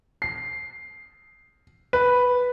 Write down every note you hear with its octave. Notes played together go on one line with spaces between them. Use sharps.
C7
B4